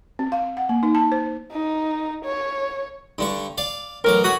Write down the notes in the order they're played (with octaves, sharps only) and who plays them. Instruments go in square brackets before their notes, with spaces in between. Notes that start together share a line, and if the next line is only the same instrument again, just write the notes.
[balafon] C4
F5
F#5
A#3
D#4
A5
C5
[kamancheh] D#4
C#5
[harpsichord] G2 D3 C#6
D5 F5
[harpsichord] A1 F#3 D6 [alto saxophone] A#4
[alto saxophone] F#4 [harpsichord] G#5 B5 D#6